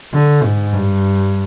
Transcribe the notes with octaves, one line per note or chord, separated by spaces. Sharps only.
D3
G#2
G2